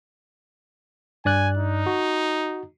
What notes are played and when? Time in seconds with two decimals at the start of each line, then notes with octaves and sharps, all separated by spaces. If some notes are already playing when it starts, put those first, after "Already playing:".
1.25 G2 D5 G#5 F#6
1.57 D#4
1.86 F#4